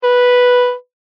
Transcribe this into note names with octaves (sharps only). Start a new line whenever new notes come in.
B4